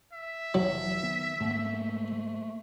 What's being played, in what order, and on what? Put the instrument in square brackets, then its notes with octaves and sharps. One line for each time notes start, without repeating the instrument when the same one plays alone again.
[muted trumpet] E5
[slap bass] F1 E3 [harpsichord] F#3
[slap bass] D#3 B3
[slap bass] G#2 [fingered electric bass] A3 A#3